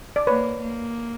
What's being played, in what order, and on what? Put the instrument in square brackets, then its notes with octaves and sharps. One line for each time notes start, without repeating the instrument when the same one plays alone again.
[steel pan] D5
[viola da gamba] A#3 [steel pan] B4 C#5
[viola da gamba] A#3